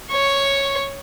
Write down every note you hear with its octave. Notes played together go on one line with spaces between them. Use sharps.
C#5 C#6